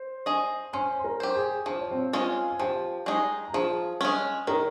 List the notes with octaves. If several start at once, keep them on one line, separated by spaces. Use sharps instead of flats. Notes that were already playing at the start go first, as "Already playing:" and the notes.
Already playing: C5 C6
G#4 D#5
C#4 C5 C6
C6
A#4 A#5
G4 C5
G#4 G#5
F3 C5
C#5
C4 C5
G#3 C#4 F4
G#5
F3 G4 G5
G#3 D#4 G#4
A#5
F3 G#4 G#5
G#3 C#4
D#3 A#4 A#5